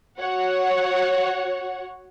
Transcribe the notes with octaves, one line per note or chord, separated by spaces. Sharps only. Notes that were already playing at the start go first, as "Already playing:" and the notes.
F#4 C#5 F#5